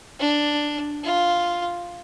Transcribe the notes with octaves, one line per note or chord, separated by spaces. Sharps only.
D4
F4